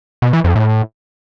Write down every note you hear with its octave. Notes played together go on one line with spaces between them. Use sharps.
B2
E3
F2
A2